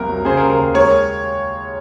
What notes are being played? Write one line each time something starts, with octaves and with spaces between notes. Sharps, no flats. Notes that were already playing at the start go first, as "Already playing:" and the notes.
Already playing: C2 F2 A#3 A#4
F#3
C#3 G#4 C5
A#4
D#2
A#4
D#2
G#3 A#4 C#5